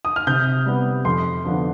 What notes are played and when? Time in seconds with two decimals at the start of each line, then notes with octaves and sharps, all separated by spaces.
0.05 D#6
0.16 F6
0.27 C3 G6
0.66 G3 B3
1.05 F2 C6
1.45 D3 F3 B3 D4